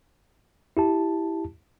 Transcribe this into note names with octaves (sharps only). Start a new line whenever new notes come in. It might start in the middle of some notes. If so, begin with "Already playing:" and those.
E4 G4 A5